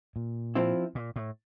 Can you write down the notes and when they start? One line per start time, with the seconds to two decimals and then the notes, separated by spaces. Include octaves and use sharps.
0.16 A#2
0.55 F3 C4 E4
0.95 A#2
1.16 A2